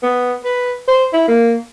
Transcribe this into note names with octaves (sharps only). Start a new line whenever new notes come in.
B3
B4
C5
E4
A#3